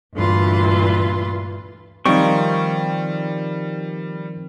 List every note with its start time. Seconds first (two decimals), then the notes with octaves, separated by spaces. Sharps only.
0.16 D2 G2 A#2 E3 F4 C6
2.06 D#3 F3 G3 C4 D#4 G5 C#6